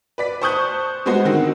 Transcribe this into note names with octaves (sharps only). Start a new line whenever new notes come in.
B4 D5 B6
C5 A5 C#6 D#6 F#6 G6
G3 G#3 B3 F#4 C5
D3 D#3 C4 F#4